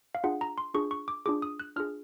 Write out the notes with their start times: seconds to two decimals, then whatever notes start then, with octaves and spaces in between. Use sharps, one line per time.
0.15 F5
0.24 D4 F4 G#4 F#5
0.41 A#5
0.58 C6
0.74 D4 F4 G#4 C#6
0.91 C#6
1.08 D6
1.26 D4 F4 G#4 D6
1.42 D#6
1.60 F#6
1.76 D4 F4 G#4 F6